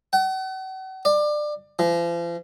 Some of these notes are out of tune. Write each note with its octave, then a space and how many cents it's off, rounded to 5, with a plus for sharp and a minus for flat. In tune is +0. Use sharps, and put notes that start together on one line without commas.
F#5 +40
D5 +25
F3 -40